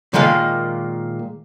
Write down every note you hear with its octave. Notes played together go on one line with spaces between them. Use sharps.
A#2 D#3 G#3 A#3 F5